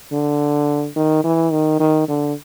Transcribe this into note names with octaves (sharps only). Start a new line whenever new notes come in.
D3
D#3
E3
D#3
D#3
D3